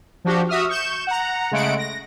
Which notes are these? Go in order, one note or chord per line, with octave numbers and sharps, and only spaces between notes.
F3 D4 F#4 G4
F#4 E5 D#6 F6
C#6 G6 E7
F#5 A#5
C#3 G#3 A3 F#5 D7
A#6